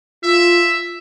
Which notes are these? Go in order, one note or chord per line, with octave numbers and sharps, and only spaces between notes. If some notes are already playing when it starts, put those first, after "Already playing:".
F4 E5